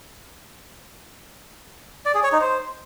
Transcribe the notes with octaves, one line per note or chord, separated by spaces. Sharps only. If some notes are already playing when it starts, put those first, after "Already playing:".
D5
G#4
C#5
D#4
C5